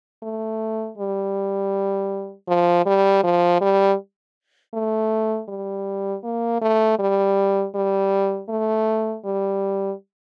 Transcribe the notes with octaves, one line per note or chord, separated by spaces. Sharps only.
A3
G3
F3
G3
F3
G3
A3
G3
A#3
A3
G3
G3
A3
G3